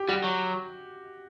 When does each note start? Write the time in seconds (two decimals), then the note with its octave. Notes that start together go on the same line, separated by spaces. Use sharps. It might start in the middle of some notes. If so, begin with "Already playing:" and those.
Already playing: G4
0.08 G3 F#4
0.24 F#3